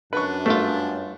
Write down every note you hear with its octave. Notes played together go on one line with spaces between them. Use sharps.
F#2 D4 B4 C#6
G2 A3 F4